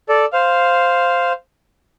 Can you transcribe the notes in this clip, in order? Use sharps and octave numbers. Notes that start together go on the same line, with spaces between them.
A4 D5
C5 F5